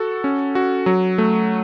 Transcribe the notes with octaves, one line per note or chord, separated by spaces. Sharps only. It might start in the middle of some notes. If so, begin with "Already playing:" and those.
Already playing: F#4 A4
C#4
F#4
F#3
A3